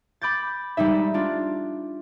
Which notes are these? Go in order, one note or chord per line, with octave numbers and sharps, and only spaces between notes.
B5 D6 G6 A6
G3 G#3 D#4 E5
D4 F4